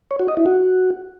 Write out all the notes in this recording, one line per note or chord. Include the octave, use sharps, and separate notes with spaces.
C#5
F#4
D#5
E4
F#4